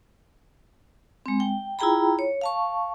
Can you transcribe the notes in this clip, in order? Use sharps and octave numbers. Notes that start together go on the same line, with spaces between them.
G#3 C4
G5
E4 F4 G#4 G5 A#5 B5
C#5
F5 A5 C#6